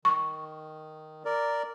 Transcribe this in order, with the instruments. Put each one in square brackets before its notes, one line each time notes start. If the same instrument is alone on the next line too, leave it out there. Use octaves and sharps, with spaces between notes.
[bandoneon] D#3 [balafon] C#6
[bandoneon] A#4 D5